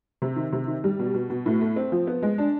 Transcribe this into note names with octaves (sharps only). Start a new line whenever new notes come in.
C3
D#3
C3
D#3
G3
B2
B2
B2
A2
A3
C4
F3
B3
G#3
D4